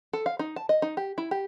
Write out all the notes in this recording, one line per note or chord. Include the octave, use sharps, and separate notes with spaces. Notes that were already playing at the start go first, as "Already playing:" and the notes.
A4
F5
D#4
A5
D#5
D#4
G4
E4
G4